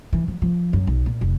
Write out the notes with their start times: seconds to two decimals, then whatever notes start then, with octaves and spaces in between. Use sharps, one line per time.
0.13 E3
0.28 F3
0.42 F3
0.73 F#2
0.87 B1
1.06 A#2
1.21 F1